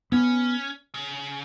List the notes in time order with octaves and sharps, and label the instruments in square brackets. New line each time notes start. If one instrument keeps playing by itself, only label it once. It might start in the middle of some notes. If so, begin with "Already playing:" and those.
[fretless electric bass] B3 [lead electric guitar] C#4
[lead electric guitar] C#3